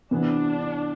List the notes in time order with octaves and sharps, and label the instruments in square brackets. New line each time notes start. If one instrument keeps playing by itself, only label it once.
[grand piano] C3 E3 B3 [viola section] D4